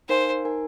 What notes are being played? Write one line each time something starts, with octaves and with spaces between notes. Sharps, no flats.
D#4 A#4 C5 F5 G#5
D#4 A#4 G#5